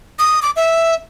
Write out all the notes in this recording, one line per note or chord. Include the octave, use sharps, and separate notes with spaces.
D#6
D6
E5